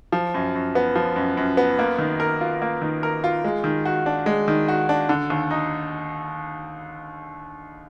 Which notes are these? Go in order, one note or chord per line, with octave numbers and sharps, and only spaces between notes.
F3
F#2
F#2
B3
F3
F#2
F#2
B3
A#3
D#3
A#4
F4
A#3
D#3
A#4
F4
G#3
D#3
F#4
D4
G#3
D#3
F#4
D4
D3
D#2
D#4